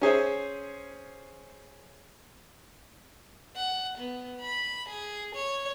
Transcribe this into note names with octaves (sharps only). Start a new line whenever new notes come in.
C#4 G#4 C5 E5
F#5
B3
B5
G#4
C#5